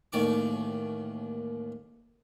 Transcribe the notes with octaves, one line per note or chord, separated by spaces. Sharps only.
A1 D#2 D#3 D5 C#6 D6